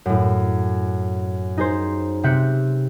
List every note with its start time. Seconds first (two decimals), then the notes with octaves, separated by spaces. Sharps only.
0.06 F#2 A2
1.57 D#4 G#4 C5
2.23 C3 C4 E5 F#6 G6 C#7